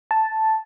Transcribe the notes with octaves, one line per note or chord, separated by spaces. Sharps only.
A5